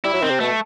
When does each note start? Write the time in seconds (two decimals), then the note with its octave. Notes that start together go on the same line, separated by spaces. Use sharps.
0.04 G3 E4
0.14 F#3
0.21 D#3 C4
0.30 C3
0.40 B2 A3